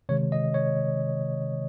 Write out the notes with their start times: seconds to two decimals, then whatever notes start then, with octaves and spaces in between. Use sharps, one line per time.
0.09 C3 D#3 G#3 C#5
0.32 D#5
0.54 C#5